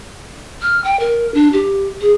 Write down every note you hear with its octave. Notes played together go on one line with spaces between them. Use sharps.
F6
G5
A#4
D4
G4
G#4